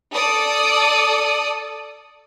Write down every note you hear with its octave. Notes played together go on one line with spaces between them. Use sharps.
A4 D5 D#6